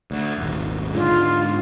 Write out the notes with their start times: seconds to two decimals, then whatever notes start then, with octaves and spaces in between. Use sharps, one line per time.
0.11 D2
0.38 D#1 G#1
0.94 G#2 D3 G#3 F4